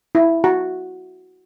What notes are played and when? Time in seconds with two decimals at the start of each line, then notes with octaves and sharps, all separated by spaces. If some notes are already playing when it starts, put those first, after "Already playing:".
0.15 E4
0.44 F#4